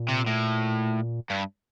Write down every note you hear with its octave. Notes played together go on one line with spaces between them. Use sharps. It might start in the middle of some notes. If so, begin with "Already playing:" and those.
Already playing: A#2
C3
A2
G2